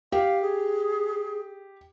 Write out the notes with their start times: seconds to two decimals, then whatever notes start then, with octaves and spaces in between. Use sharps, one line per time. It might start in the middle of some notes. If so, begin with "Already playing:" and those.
0.12 G4 F5
0.42 G#4